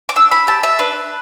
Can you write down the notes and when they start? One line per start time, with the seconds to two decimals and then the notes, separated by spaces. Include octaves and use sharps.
0.09 D6
0.16 D4 E6
0.31 B5
0.47 G4 A5
0.63 E5
0.79 D4 B4